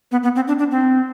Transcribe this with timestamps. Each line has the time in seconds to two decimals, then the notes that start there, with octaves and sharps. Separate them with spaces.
0.12 B3
0.23 B3
0.35 C4
0.48 D4
0.59 D4
0.71 C4